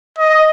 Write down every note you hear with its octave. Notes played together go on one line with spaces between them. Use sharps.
D#5